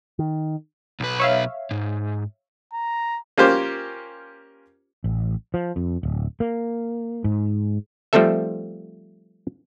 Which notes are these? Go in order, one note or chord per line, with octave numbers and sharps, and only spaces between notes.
D#3
B1 B4
C#5 E5 F5
G#2
A#5
A#3 C#4 F4 G4 C5
A1
F3
F2
D1
A#3
G#2
F3 G3 A3 C4 A4 E5